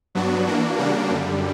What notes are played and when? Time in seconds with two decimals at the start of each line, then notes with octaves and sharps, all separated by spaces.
0.15 G2 F#3 B3 D4 F#4
0.47 E3 A#3 D4 F#4
0.78 C#3 G3 A#3 D4 F#4
1.10 F#2 D3 G3